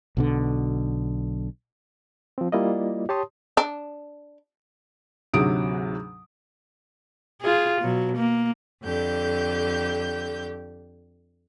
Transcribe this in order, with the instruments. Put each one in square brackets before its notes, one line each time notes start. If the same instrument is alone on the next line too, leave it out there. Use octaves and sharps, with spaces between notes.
[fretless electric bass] B1 B2 D3
[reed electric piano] F3 C4
G3 A#3 E4 F4 D5 D#5
G4 C#5 A5 C6 D#6
[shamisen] D4
[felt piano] D2 G#2 C3 F#3 D#6 D7
[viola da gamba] F4 G#4
B2 F#3
A#3
[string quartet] F2 D3 G4 G6